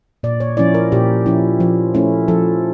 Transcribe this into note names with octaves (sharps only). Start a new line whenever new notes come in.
A#2 D5
C#5
F3 C#4 E4 D5
A#4
A#2 G4
F3 C#4 E4
F3
A3 C#4 E4
F3 A4